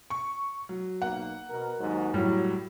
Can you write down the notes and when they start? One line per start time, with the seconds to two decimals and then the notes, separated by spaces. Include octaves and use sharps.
0.10 C#6
0.69 F#3
1.02 B1 A#3 F#5
1.49 B2 A#4
1.80 D#2 G#2 F#3
2.14 A2 F#3 G3